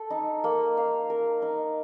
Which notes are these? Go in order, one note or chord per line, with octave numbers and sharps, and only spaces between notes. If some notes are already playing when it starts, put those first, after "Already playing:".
Already playing: A4
D#4
A#3
F5
A#4
D#4